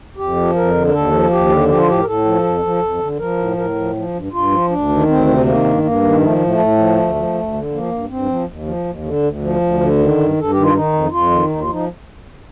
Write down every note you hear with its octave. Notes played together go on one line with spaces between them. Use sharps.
F2 G4
F3
F2 A#4
D3
A#4
D#2 A4
F3
D#2 G4
D3
F3 G4
F4
A2 G4
A#4
A2 A4
F3
F2
F3
F2
D3
F3 A#4
A2
A2 A#4
F3
F3
G2
G2 F4
F3
D2 D4
D#3
D2 C4
C3
D#3 A#3
G2
G2 A#3
D#3
F3 A3
A2
A3
A2
F3
D2
F3
D2
D3
F3 A#3
G2
G2 C4
F3
D#2
F3
D#2
D3
D2
F3
D2
D3
D#3
G2
G2 A4
D#3 G4
F4
D#3 D#4
F2
F2 F4
D#3
D#2 D#4
F4
F3 D#4